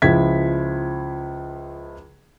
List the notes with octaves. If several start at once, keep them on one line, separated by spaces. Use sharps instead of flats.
C#2 F3 E4 G#6 B6